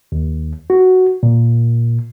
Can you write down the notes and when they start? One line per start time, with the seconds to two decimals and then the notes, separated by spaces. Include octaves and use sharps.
0.12 D#2
0.70 F#4
1.23 A#2